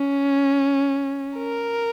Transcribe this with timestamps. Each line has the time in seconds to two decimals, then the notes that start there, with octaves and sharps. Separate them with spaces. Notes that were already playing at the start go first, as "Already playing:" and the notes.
Already playing: C#4
1.38 A#4